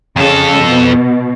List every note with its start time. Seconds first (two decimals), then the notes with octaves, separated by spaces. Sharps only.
0.16 F2 C#3 A4
0.65 B2